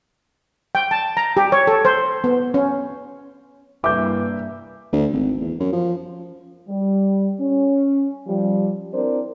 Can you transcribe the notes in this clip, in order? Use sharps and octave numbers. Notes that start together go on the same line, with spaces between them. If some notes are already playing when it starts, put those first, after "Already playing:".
G5
A5
A#5
G4
C#5
A4
C5
B3
C#4
G2 C3 E3 A#3 E5 D6 G6
D2
G#1
E2
F#2
F3
G3
C#4
F3 G3
C4 D4 E4 A#4 C5 D5